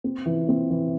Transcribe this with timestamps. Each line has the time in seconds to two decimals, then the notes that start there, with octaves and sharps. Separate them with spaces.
0.04 C4
0.26 E3
0.49 C4
0.70 E3